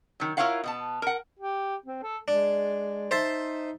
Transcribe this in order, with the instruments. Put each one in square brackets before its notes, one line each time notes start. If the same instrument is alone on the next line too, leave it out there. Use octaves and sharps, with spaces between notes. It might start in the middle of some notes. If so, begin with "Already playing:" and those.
[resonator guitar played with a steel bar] D#3 F#3
E4 F4 A#4 C#5 F5 F#5
B2 B3 A5
A#4 F#5
[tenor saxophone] G4
C4
A4
[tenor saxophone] G#3 [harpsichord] D4
[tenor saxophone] D#4 [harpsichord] C5 E5 A5